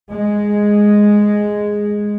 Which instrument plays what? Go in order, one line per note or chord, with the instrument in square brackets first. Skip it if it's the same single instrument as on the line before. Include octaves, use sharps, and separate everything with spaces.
[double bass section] G#3